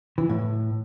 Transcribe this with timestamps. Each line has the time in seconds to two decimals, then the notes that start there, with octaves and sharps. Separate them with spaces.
0.18 E3
0.29 A2